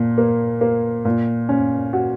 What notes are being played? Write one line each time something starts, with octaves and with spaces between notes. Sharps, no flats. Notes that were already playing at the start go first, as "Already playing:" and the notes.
Already playing: A#2
A#3
A#3
A#2
C#4
F#4